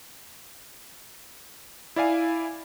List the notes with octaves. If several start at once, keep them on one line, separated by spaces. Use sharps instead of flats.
E4 D5 F5 G#5